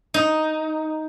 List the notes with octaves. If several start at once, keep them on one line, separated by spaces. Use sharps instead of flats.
D#4